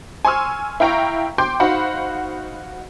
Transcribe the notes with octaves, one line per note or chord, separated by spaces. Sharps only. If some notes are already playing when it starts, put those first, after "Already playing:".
G#5 C6 C#6 E6 F6
E4 F5 G5 A#5 C#6
G5 C6 D6 G6
D#4 F#4 C5 F5 F#5 B5